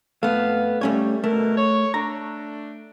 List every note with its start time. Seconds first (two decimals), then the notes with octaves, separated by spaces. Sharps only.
0.23 F2 A3 B3 F5
0.81 G3 A3 C#4 C#5
1.24 B2 D3 A3 A#4
1.57 C#5
1.94 A3 D4 A#5